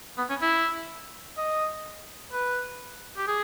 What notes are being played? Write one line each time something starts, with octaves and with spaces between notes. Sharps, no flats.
B3
C#4
E4
D#5
B4
G4
G#4